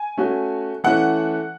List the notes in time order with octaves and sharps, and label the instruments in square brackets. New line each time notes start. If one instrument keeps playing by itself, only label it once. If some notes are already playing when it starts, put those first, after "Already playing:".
Already playing: [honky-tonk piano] G#5
[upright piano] A3 C#4 F#4
[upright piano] E3 A3 C#4 [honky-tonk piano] F#5